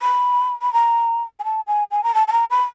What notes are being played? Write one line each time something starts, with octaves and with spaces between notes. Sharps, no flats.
B5
B5
A#5
G#5
A5
G#5
G#5
A#5
A5
A5
A#5
B5